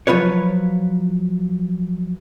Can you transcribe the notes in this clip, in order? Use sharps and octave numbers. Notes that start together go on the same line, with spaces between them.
F3 F#3 F4 B4 C#5